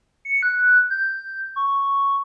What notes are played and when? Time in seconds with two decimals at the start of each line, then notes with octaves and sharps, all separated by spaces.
0.25 C#7
0.43 F#6
0.90 G6
1.56 C#6